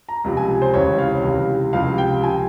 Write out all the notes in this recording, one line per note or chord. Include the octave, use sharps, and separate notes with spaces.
A#5
C#2 C3 F3
G#5
C5
C#2 C3 E3 C#5
F5
C#2 C3 E3
C#2 C3 F3 F5
G5
C3 F3 G#5